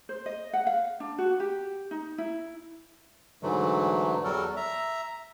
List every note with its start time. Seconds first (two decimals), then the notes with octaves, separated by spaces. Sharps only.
0.09 C5
0.26 D#5
0.53 F#5
0.67 F5
1.00 D4
1.18 F#4
1.40 G4
1.91 D#4
2.18 E4
3.43 G#2 D3 E3 F#3 A3
4.24 E2 F#3 G3 F#4 A4 A#4
4.56 E5 A#5